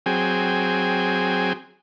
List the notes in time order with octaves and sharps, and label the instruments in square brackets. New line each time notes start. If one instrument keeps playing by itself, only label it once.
[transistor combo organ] F#3 C4 G#4 G5 G#5